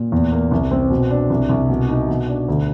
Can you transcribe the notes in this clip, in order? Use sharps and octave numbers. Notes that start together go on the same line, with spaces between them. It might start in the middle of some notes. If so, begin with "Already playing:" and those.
Already playing: A#2
E2
A#3
C2
C4
B2
D4
C2
C2
B2
D#4
B2
D4
D2